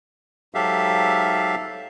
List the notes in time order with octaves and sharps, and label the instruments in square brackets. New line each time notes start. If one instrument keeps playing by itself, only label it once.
[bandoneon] G#2 F#3 G4 A4 E5 F5